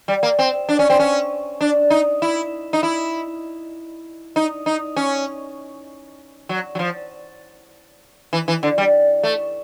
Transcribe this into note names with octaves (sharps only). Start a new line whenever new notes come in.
G3
A#3
C4
D4
C#4
C4
C#4
D4
D#4
E4
D#4
E4
D#4
D#4
C#4
F#3
F#3
F3
E3
E3
D3
G3
A3